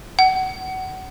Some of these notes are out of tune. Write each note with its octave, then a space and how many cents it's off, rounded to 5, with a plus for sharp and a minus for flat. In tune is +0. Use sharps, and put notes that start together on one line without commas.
F#5 +25